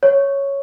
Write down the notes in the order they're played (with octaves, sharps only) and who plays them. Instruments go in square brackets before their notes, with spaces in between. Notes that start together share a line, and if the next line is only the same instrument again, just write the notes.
[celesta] C#5